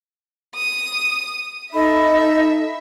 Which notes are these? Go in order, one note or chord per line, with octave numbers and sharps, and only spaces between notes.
D#6
D#4 A4 D#5 E5 B5